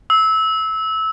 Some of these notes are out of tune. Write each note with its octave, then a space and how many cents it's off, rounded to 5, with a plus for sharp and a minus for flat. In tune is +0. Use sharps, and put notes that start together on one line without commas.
E6 -20